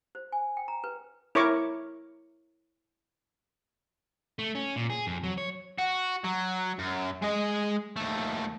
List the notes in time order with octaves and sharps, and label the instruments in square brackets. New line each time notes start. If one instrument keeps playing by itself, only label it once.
[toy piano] C5
G#5
G5
A#5
B4
[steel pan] E4 A#4 C#5 A#5 C#6 D6
[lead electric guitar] A3
C#4
A#2
G#4
F2
F#3
C#5
[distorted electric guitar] F#4
F#3
F#2
G#3 D#5
D#2 A3